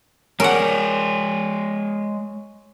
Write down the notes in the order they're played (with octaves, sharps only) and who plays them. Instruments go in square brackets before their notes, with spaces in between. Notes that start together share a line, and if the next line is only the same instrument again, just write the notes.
[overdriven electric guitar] G#3 D5 [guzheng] A#4 F#5 [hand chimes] C#5 G#5 C#6